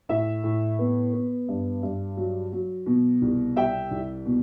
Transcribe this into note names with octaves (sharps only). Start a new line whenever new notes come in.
A2 E5
A2
B3
B3
G2
G2
F#3
F#3
B2
C2
G3 E5 G5
C2
B2